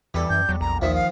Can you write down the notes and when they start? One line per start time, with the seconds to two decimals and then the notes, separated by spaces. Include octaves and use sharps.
0.14 E2 E3 G3 A4
0.30 F#2 G6
0.49 E2 F#3
0.61 A#1 A#5
0.82 D#2 D#3 F3 E5
0.95 F5